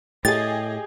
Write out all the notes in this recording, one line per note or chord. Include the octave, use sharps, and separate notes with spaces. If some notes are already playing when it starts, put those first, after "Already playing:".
A2 G4 G#4 D#5 A6